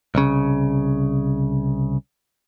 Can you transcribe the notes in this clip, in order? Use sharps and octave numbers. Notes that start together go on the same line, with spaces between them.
C2 C#3